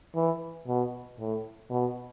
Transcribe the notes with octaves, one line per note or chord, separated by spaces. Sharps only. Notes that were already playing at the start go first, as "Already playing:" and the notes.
E3
B2
A2
B2